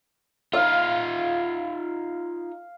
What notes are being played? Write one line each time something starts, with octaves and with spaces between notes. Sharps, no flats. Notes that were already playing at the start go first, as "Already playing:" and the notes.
D#4 F4 F5